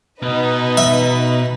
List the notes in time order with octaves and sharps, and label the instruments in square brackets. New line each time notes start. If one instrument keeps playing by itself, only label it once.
[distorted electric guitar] B2 [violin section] D#4 B4
[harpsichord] E5